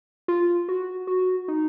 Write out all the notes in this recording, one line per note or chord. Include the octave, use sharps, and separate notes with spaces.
F4
F#4
F#4
D#4